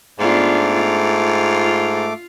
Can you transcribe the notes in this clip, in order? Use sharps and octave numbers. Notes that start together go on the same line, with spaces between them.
G#2 A3 B3 D4 F4 D6
F4